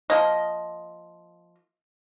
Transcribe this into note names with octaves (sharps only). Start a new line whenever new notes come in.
F3 A#3 D#5